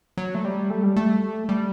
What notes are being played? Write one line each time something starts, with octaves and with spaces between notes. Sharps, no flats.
F#3
A3
G3
A3
G3
A3
G3